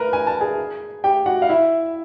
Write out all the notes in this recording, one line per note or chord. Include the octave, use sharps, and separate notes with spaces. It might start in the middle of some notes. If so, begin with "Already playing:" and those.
Already playing: A#4 B4 A#5 B5
G#5
A5
G#4 G#5
G4 G5
F#4 F#5
F5
E4 E5